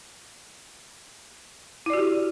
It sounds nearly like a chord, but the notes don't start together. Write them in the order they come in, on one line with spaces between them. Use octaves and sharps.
E4 D5 F#4 G4